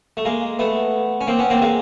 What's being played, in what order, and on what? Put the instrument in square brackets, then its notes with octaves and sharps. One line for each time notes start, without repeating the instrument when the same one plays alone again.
[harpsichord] A3
G#3 A#3
A3 B3
C#4
A#3 C4
B3 C#4
A#3 C4
G#3 A#3